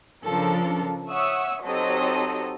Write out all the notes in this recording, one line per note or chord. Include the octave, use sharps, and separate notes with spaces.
C#3 F3 D4 A4 A#4
C#5 E5 F#5 C#6 D#6 E6
F#3 C4 D#4 G4 A4 D#5